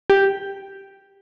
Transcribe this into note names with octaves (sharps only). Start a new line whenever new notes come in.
G4